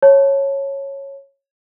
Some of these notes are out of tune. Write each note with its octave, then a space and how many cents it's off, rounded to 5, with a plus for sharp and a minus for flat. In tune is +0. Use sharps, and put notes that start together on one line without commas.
C#5 -10 A5 +0